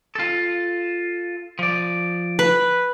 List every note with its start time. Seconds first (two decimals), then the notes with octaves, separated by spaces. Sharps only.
0.15 F4 A4
1.59 F3 D5
2.39 B4